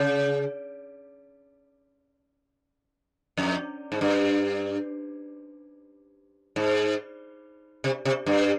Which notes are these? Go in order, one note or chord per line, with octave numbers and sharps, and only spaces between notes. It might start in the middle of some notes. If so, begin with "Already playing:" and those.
Already playing: C#3
F2
G#2
G2
G#2
C3
C3
G2